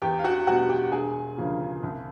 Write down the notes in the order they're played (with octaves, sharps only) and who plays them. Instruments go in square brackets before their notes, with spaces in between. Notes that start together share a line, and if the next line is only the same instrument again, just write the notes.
[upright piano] E2 G4 G5
F5
F#4 F#5
B2 G3 B3 F#4 F#5
G4 G5
E1 G#4 G#5
D2 C#3 F3 A#3
C2